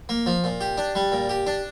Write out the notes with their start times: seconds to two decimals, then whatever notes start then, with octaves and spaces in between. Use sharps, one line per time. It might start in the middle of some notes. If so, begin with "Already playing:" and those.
0.09 A#3
0.26 F3
0.44 A#2
0.61 G4
0.78 D4
0.95 G3
1.12 A#2
1.29 G4
1.47 D4